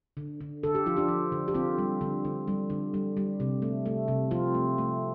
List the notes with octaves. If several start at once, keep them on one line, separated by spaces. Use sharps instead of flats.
D3
D3
D3 A4
G4
F3 F4
D4 G4
F3
D3
G4
D3 C4 F4
G3
D3
D3
G3
D3
G3
G3
C3
A3
A3
C3
F3 C4 F4
A3
A3